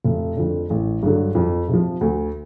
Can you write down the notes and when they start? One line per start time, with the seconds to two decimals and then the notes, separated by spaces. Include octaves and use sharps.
0.05 F1
0.37 F2 D3
0.70 A1
1.03 G2 D3 F#3
1.35 F2
1.68 C3
1.73 F3
2.01 D2